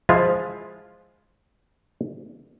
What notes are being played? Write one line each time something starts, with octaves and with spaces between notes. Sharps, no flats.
F3 G#3 E4 F4